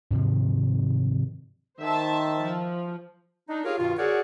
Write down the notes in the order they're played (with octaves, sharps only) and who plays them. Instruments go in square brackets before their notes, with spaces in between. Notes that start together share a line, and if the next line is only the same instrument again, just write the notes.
[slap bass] G#2 C3 D#3 F3
[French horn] D#3 [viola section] C5 E5 A5
[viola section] F3
[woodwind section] D4 D#4
F4 G4 G#4 A#4 C#5 F5
G2 B2 D#3 F4
F#4 G#4 A#4 C#5 D5 F#5